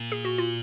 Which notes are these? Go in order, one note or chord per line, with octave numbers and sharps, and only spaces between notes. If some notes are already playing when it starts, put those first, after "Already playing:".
Already playing: A#2
G#4
F#4
F4